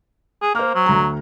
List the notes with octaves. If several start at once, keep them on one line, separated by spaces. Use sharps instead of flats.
G#4
A#3 C5 F6
F#3
D2 A#5